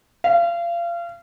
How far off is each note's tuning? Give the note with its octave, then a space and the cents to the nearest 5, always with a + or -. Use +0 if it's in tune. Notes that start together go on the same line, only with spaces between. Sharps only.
F5 -30